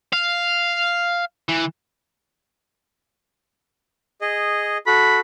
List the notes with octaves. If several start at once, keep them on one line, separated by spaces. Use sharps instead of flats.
F5
E3
G#4 D#5
F#4 A4 B5